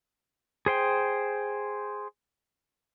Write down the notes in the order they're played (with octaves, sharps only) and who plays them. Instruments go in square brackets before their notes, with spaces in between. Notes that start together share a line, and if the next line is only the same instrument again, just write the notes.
[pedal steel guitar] G#4 C5 G5